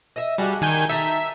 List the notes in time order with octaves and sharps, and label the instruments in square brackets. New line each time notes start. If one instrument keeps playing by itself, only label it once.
[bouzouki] D#5 E5
[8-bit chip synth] G3 [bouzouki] D4 F#4 G#4
[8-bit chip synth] D#3 G#5 G6
[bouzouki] D#4 A4 A#5 [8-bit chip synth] E5